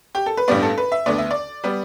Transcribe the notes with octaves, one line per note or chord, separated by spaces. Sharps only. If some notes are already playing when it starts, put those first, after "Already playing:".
G4
A4
B4
A1 G2 G3 B3 D5
A4
B4
E5
D2 D3 B3 D5
E5
D5
G3 B3